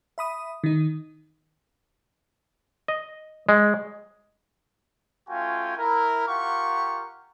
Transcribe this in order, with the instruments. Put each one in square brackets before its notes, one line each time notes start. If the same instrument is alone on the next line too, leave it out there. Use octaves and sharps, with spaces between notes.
[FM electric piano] E5 B5 D#6
D#3 D#4
[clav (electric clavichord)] D#5
G#3
[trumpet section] A3 C#4 F4 F#4 G5 G#5
E4 A#4
F4 G4 A#4 F5 F#5 C#6